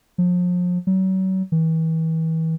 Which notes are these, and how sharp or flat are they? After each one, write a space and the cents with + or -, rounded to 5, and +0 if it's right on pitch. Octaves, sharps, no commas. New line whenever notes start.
F3 +35
F#3 +35
E3 -35